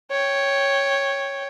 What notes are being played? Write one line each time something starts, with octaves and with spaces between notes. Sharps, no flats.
C#5 G5